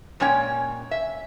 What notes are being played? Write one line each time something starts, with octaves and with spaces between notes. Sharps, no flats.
A#2 G#3 C#4 C#5 G5
E5